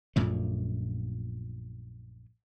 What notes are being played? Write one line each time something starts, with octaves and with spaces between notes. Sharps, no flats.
A#1 F#2 A#2 A3